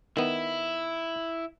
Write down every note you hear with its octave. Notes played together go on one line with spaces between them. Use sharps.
D#3 B3 E4